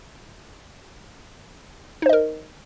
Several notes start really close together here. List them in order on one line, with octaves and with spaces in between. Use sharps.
D#4 C5 D#5 A#4